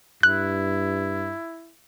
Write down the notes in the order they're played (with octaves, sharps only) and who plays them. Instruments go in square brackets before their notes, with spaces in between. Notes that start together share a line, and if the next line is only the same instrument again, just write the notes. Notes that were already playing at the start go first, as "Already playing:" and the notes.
[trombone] G2 [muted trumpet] E4 [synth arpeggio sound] F#6